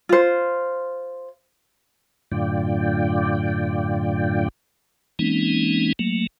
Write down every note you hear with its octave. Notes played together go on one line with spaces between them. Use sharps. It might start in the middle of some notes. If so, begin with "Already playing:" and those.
F4 C5
F#2 A2 D3 F4 D5 G5
E3 G#3 A#3 C4 C#4 D#4
F#3 A3 A#3